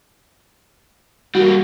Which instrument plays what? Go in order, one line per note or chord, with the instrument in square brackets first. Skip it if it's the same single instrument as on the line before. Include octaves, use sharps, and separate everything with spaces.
[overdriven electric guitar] G3 A#3 [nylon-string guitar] F#4